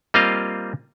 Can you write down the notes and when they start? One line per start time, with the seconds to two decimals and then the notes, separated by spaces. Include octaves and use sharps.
0.14 G3 A#3 C4 F4 D#5 F5